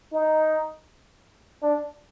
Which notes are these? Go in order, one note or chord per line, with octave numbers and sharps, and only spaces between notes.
D#4
D4